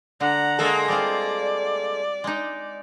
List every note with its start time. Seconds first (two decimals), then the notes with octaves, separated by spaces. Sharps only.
0.20 D3 F#5 A#5
0.59 G#3 A#3 A4
0.88 G3 C4 F4 D5
2.24 G#3 D#4